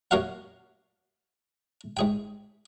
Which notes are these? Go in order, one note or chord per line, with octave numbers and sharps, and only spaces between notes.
F#2 A#3 F#4 A#4 F5 F#5
G#2 G#4 G5